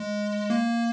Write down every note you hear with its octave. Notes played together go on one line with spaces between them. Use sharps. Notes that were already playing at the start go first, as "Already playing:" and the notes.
Already playing: G#3
A#3